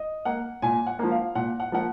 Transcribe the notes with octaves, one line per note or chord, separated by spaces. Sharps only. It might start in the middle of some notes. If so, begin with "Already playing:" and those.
Already playing: D#5
A#3 F#5
A#2 G#5
F#5
F3 A#3
F5
A#2 F#5
F#5
F3 A#3 F#5